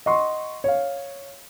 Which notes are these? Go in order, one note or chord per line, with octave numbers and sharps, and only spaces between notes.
D#5 F#5 C6 C#6
C#5 F5